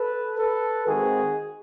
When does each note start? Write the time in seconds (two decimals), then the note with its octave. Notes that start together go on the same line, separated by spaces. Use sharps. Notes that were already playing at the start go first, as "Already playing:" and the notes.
Already playing: A4 B4
0.39 A4 B4
0.87 D#3 G#3 C4 F#4 G#4